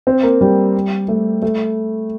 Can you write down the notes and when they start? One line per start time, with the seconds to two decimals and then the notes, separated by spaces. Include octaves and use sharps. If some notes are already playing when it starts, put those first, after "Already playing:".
0.07 C4
0.23 A#3
0.41 G3
1.08 A3
1.42 A3